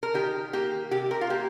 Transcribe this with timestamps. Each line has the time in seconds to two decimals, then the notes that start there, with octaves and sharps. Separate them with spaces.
0.03 A#4
0.14 D#3 G4
0.53 A#3 G4
0.91 C3 G4
1.11 A#4
1.21 F4
1.30 A#3 G4